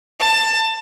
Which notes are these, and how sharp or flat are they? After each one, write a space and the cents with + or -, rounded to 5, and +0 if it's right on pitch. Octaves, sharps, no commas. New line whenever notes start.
A5 +20